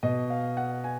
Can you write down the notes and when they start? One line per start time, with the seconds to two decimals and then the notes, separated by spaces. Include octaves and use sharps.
0.03 B2 D#5
0.30 F5
0.57 F#5
0.84 G#5